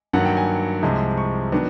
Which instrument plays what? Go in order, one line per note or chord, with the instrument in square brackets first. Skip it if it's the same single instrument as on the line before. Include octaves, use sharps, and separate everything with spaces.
[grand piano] G2 D#3 F#3 A#3 F#5
G5
G#5
C2 C3 F3 G#3
C#6
D#3 F#3 B3 D4